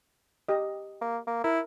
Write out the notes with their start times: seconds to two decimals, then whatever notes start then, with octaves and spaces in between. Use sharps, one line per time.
0.49 G4 D#5
1.01 A#3
1.27 A#3
1.44 E4 A#4 A#5